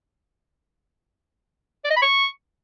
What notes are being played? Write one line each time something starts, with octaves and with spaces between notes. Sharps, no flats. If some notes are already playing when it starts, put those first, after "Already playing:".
D5
D#5
B5
C#6